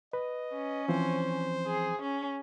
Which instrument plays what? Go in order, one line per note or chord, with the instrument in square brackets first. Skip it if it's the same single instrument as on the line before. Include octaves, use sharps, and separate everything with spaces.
[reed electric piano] B4 [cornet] D#5
[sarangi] C#4
[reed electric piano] E3 F3 C4 [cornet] C5
[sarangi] G#4
C#4